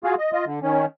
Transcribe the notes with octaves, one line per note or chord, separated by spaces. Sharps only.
F4 F#4 G#4 F5
D#5
F4 D#5
D3
D#3 C#4